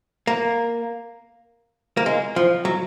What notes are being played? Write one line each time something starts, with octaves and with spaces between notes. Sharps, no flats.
A#3
A#3
G#3
F3
F#3